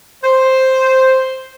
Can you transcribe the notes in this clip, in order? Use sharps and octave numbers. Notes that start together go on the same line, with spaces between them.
C5